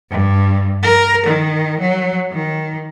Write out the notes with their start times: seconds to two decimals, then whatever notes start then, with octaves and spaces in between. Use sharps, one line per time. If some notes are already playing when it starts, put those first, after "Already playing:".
0.11 G2
0.83 A#4
1.27 D#3
1.80 F#3
2.32 D#3